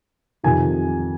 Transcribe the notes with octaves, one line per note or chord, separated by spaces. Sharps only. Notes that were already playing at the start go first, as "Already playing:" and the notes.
F2 C3 D#3 G#5